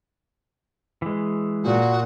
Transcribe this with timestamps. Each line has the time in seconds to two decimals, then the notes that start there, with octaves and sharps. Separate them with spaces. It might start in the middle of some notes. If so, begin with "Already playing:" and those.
1.02 E3 G#3
1.64 A#2 F#4